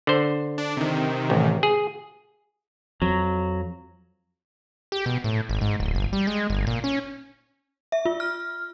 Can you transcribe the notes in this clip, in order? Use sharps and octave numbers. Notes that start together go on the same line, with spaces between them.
D3 C5
D4
C3 D#3
A1
G#4
F2 F3 F#3
G4
B2
A2
G#1
G#2
D1
G1
G3
G#3
G1
A#2
C#4
E5
F4
F6